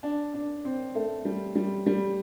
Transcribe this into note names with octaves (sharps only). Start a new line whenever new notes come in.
D4
D4
C4
A3
G3
G3
G3